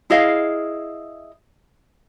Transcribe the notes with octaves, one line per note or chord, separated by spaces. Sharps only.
E4 G#4 D#5 F5